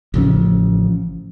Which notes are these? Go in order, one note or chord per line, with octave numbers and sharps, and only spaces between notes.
A1 C#3 F3 C#4